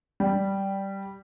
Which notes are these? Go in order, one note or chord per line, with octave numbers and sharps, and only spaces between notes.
G3